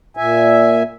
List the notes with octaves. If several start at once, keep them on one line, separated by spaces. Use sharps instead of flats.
A#2 E5 G#5